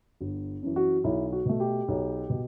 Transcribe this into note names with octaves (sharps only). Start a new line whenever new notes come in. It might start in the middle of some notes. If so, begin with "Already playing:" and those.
G1
F#2 E3
F#4
B1 E4
F#4
B2 A3
G4
B1
B2